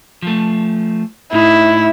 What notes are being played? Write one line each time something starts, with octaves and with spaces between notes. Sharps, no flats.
F3 A3
A2 D#4 E4